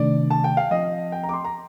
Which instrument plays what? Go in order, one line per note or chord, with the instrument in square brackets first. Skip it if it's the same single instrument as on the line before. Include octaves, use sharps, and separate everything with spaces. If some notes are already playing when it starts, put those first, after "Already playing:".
Already playing: [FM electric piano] C3 D#3 A3 D4 [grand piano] D5
[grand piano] A5
G5
F5
[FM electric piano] F3 C4 F4 [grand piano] D#5
[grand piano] G5
A#5
D6
C6
A#5